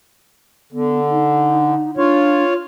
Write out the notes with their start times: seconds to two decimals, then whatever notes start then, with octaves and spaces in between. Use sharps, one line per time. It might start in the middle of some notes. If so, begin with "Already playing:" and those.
0.73 D3 B3
1.11 D#4
1.97 D4 F4 C#5